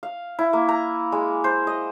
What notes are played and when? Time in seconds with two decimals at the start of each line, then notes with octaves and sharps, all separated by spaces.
0.03 F5
0.39 E4
0.53 A#3
0.69 A#5
1.12 G#3
1.44 C5
1.67 D#5